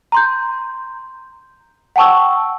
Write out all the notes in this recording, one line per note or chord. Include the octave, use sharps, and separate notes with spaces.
A#5 C6 G6
F#5 G5 A5 C#6 E6